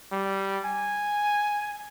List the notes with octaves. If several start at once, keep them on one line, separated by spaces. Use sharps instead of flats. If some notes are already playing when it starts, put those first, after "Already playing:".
G3
G#5